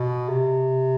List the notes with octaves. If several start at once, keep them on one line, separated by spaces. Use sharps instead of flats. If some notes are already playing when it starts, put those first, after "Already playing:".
Already playing: B2
C3